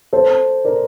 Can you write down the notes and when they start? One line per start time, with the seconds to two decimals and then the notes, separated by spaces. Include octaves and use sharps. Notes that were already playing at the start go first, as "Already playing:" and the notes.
0.13 A4 C5
0.65 A#4 D5